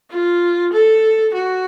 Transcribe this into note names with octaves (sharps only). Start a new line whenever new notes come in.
F4
A4
F#4